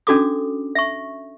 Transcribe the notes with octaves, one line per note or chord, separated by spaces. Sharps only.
C#4 D4 F#4 A4 D6 D#6
E5 C#6